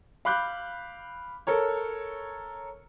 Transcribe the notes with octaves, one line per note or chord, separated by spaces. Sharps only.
F5 B5 D6 F#6 G6
A4 A#4 C#5